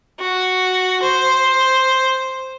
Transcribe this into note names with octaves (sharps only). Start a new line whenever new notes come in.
F#4
C5